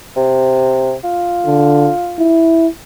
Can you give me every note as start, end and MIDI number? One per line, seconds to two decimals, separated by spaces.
0.16 0.94 48
1.04 2.29 65
1.46 1.90 50
2.19 2.67 64